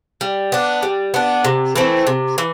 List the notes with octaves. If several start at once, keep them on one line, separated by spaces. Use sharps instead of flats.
G3
B3 D4
G3
B3 D4
C3
E3 A3 C4
C3
E3